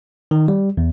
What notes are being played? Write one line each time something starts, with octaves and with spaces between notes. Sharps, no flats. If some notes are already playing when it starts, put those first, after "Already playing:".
D#3
G3
E2